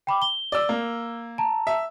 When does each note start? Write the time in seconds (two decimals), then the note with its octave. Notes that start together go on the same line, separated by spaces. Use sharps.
0.07 G5 B5 D6
0.22 G7
0.52 D5 E6
0.69 A#3
1.38 A5 A#5
1.67 E5